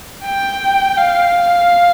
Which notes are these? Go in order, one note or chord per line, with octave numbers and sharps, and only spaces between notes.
G5
F5